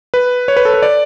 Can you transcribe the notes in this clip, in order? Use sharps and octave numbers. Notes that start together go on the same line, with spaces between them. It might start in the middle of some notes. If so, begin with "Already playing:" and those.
B4
C#5
B4
A4
B4
D5